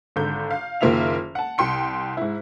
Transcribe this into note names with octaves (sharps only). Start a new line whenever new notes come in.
G#1 D3 G6
F5
F#1 D#3 A#3 F4 E5 F7
F#5 A5
C2 G5 C6 C#7
G#2 E4